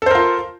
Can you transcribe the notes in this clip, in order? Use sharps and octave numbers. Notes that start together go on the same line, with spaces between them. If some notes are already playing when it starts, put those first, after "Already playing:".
F4 A4 A#4 C5